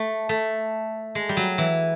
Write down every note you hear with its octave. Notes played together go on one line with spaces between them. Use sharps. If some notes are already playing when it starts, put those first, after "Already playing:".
Already playing: A3
A3
G#3
G3
F#3
E3